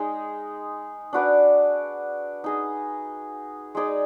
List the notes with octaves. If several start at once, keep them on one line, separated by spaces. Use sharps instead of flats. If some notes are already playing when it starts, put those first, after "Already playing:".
Already playing: G#3 D#4 G#4
D4 F#4 B4 D5
D#4 G#4 D#5
G#3 D#4 G#4 D5